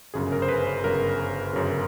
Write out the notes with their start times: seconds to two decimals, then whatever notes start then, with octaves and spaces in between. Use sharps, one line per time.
0.14 G1 F#2 C#3 G#4
0.32 A#4
0.42 C5
0.49 B4
0.67 B4
0.84 G1 F#2 C#3 A#4
1.53 G1 F#2 C#3